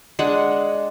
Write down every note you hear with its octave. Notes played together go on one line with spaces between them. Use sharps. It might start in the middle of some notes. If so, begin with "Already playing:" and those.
G#3 D4 F#5